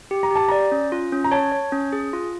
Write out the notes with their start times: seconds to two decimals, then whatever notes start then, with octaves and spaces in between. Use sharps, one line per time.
0.11 G4
0.23 A#5
0.31 G4 A5
0.48 D5 A#5
0.72 C#4
0.92 F4
1.12 C#4
1.24 A#5
1.32 C#5 A5
1.52 C#5
1.72 C#4
1.93 G#4
2.13 F4